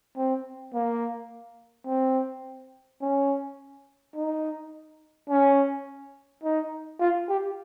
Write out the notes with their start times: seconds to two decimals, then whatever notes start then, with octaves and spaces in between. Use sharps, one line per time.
0.17 C4
0.74 A#3
1.87 C4
3.02 C#4
4.16 D#4
5.30 C#4
6.43 D#4
7.01 F4
7.29 G4